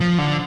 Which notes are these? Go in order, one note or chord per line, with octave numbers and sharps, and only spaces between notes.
F3
D3